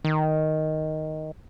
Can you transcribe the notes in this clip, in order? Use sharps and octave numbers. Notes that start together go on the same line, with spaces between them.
D#3